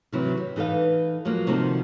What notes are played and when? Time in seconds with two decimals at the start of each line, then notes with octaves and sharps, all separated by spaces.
0.12 C3 D#3 E3 F#3 E4
0.37 G4
0.56 E3 D#4 A4 B4 F5
1.25 F3 F#3 G#3 A#3
1.47 C3 D#3 F3 D#4 F#4 A4